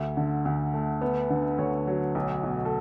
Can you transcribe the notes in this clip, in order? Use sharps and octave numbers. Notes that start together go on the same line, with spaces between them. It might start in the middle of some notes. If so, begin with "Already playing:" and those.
Already playing: D2 E5
D3
D2
A3
B3
D3
D2 C#5
F#3
B1
B2
A4